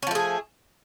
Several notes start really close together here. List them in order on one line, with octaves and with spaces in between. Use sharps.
C#4 F3 A3 G#4